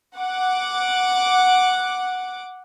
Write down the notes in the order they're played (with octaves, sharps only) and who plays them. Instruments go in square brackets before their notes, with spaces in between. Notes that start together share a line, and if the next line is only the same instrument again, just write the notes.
[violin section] F#5 D6